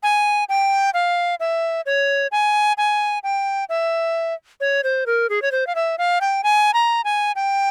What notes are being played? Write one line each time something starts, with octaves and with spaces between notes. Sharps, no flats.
G#5
G5
F5
E5
C#5
G#5
G#5
G5
E5
C#5
C5
A#4
G#4
C#5
C5
F5
E5
F5
G5
G#5
A#5
G#5
G5